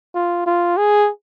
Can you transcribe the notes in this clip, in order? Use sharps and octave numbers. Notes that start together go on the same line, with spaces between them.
F4
F4
G#4